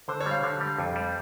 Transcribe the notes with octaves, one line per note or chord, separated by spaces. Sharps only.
D3 C5
C#5
G3
F5
D3
G3
F2
G3